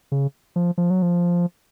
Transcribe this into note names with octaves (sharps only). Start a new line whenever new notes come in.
C#3
F3
F3
F#3
F3